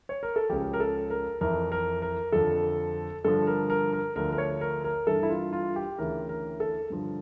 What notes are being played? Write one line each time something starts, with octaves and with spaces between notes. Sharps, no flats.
C#5
A#4
A4
C#2 C#3 F3 G4
A#4
A4
A#4
F2 E3 A#4
A#4
A#4
F2 D3 F3 A4
G2 D3 F3 A4
A#4
A#4
A#4
D2 D3 F3 A#4
A#4
C#5
A#4
A#4
G2 E3 A4
E4
F4
F4
G4
D2 C#3 E3 A#4
A#4
A4
G2 D3 F3